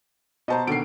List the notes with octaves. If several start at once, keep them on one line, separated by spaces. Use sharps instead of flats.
B2 C5 D#5 A5 A#5
B2 D3 D#3 C7 D7